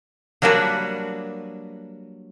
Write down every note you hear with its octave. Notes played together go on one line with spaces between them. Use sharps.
F#3 G3 A#3 D4 F#4 B4